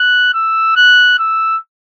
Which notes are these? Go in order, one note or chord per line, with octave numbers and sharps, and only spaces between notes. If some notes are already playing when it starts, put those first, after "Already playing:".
Already playing: F#6
E6
F#6
E6